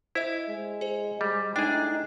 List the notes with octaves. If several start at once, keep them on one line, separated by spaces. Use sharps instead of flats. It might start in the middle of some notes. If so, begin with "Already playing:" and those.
E4 C5 D#5 E5
G#3
G#4 C5
G3 G#3
A2 D4 D#4 G#4 G5